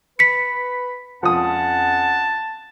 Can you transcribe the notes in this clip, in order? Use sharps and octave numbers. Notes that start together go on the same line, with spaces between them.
B4 B5 B6 C#7
F2 F3 C#4 F#5 A5 D#6